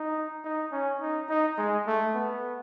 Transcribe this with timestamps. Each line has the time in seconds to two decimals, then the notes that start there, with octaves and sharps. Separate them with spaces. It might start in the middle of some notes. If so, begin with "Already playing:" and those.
Already playing: D#4
0.45 D#4
0.72 C#4
1.01 D#4
1.29 D#4
1.58 G#3
1.87 A3
2.15 B3